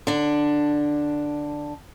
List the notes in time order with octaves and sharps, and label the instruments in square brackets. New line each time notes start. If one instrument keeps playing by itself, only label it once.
[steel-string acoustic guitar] D3 D4